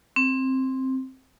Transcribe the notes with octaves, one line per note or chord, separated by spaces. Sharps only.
C4